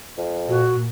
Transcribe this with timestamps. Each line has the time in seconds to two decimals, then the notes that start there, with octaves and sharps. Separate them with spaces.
0.17 F2
0.49 A#2 F#4